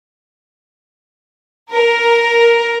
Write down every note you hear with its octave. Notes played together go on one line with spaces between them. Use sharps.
A#4